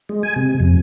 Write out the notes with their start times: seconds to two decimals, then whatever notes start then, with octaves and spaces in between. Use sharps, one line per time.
0.09 G#3
0.23 G#5
0.36 C3
0.60 F2